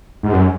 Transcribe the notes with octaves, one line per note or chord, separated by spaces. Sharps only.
G#2
F#2